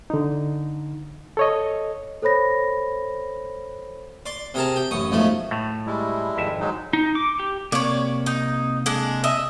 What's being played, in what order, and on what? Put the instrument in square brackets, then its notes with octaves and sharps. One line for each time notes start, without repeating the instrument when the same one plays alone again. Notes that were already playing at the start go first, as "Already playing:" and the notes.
[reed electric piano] D3 D#4
A4 C#5 D#5
[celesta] A4 C5 C#5 B5 A#6
[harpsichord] D5 C6
C3 G#4 A#4 A5
G4
A1 F#2 C#6 D#6
B1 G#2 F3 A3
[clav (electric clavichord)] A2 A3
[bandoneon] G3 G#3 E4
[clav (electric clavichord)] G#1 F2 E5
[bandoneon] F#3 G#3 D#4
[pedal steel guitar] D#4
D6
G4
[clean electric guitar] C3 A#3 [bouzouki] C#5 D5
[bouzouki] D#4
G#3 D4
D#5 E5